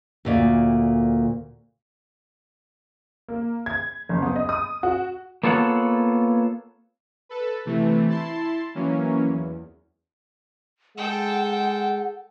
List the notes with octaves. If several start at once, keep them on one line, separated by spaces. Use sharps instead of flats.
D2 A#2 D5
A#3
G#6
F#1
B3
D#5
D#6
F#4
A#3 B3 F4 A4 C#5 F#5
A4 B4
C3 E3 A3
E4 A5 C6
E3 F#3 A#3 C#4
E2
G#3 A4 F#5 G5